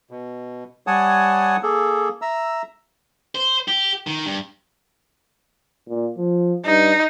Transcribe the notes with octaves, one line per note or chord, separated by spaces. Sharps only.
B2
G3 C#5 F#5 G#5 A5 D#6
A#3 G#4 A4
E5 A#5 E6
C5
G4
D#3
G2
A#2
F3
G2 D#4